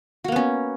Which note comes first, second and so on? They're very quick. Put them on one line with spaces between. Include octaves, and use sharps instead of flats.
F#4 A#3 B3 C#4